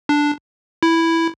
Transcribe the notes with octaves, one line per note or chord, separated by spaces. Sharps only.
D4
E4